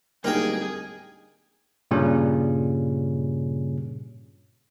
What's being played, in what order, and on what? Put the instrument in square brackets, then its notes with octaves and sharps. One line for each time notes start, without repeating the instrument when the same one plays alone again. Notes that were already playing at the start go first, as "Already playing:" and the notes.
[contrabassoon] D1 [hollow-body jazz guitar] G3 A#3 D#4 [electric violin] G#4 [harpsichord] A#4 G5
[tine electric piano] G2 A#2 C#3 G3 C#4